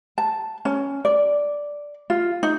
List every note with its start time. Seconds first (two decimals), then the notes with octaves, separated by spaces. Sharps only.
0.18 A5
0.65 C#4
1.05 D5
2.10 F4
2.43 D#4